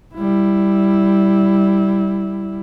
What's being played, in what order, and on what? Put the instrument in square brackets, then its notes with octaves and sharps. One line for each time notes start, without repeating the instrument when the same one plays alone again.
[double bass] G3 E4